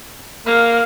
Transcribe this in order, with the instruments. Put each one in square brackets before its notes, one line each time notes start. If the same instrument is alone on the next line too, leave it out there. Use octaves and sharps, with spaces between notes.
[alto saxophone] A#3 [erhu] F5